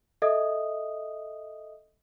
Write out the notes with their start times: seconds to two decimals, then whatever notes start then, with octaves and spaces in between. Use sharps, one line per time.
0.22 A4 D#5 E5 D#6